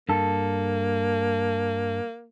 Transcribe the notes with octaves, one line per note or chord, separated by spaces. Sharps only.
G2 A#3 A4